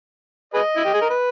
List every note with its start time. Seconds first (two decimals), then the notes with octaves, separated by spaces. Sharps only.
0.54 G#4 B4 D#5
0.76 E4
0.85 G4
0.94 G#4
1.02 A#4
1.10 B4